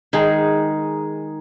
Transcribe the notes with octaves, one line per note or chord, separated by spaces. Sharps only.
D#3 G#3 D#4 G#4